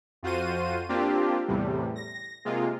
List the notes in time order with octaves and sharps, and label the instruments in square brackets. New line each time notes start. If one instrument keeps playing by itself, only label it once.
[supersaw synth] F2 F4 F#4 C5 D#7
A#3 C4 D4 F4 G4
E2 A2 C3 G3
A#6
C3 G#3 A#3 F4